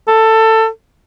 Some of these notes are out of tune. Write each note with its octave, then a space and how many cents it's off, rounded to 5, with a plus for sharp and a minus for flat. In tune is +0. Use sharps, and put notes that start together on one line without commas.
A4 +15